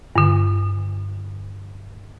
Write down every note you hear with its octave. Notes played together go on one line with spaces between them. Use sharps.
G2 D3